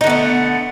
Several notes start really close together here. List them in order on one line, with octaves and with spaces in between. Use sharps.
D#4 D3 B3 A3